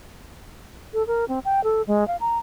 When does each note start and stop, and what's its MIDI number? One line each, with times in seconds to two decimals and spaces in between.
0.93 1.05 69
1.07 1.25 70
1.28 1.39 60
1.45 1.63 79
1.64 1.82 69
1.87 2.06 56
2.08 2.16 77
2.20 2.38 82